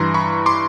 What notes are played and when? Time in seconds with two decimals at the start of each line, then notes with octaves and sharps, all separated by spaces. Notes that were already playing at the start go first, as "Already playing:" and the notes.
Already playing: G2 E3 A#5 C6
0.14 B5 C#6
0.46 C6 D6